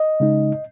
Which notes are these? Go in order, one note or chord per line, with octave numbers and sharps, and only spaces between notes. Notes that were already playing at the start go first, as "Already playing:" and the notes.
Already playing: D#5
C#3 G#3 D#4